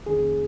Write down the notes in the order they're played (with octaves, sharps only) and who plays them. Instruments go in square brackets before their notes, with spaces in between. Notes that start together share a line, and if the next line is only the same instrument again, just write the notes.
[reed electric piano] F2 D#3 A#3 C#4 G#4